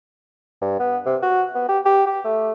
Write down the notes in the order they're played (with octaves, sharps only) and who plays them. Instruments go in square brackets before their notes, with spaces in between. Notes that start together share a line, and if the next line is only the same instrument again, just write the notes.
[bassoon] G2
B3
C3
F#4
B3
G4
G4
G4
A3